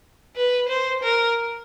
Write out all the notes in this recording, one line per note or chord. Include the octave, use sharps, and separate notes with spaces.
B4
C5
A#4